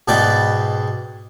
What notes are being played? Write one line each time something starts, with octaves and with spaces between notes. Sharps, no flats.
G#2 B2 E4 B4 D5 G5